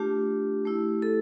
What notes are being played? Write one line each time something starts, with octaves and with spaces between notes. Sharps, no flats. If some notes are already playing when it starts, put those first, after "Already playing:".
Already playing: A3 D4 F4 G4
A3 E4
A4